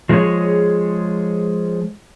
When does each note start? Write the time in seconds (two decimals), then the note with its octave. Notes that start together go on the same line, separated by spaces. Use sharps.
0.09 F3 G#3 B3 E4 G#4 C#5